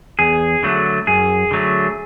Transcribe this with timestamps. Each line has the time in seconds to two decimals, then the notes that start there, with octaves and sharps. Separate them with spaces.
0.19 E2 G#4
0.63 D3 F#3 A3
1.07 F#2 G#4
1.51 D3 F#3 A3